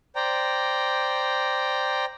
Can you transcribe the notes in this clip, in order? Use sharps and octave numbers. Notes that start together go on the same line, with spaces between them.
C5 D5 G5 A#5